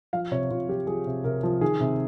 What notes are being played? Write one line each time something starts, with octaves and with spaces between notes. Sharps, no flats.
F3 F5
C3 C#5
C3 F4
F3 G4
F3 G#4
C3
C3 A#4
F3
D#3 G#4
C3